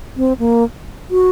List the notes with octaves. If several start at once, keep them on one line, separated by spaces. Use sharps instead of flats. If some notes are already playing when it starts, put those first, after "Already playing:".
C4
A#3
F#4